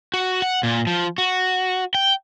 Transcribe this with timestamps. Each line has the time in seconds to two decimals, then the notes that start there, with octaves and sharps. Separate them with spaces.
0.14 F#4
0.42 F#5
0.63 A#2
0.87 F3
1.18 F#4
1.95 G5